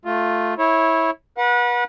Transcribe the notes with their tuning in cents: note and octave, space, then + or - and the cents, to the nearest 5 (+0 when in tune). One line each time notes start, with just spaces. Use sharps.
A3 +0 F4 +5
E4 -15 C#5 -20
B4 -35 F#5 -30